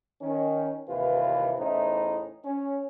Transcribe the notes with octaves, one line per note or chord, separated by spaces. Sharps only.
D#3 C#4
D#2 C3 E3 F4 B4
E2 A2 C#4 D#4 E4 C5
C#4